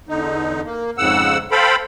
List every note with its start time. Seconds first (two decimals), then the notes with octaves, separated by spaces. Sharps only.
0.09 E2 D3 D#4
0.65 A#3
0.98 F2 G#2 C#3 F#5 E6
1.51 A4 C5 F5 G5 B5